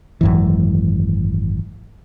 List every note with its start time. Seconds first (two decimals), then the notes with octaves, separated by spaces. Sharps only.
0.21 G#1 F#2 E3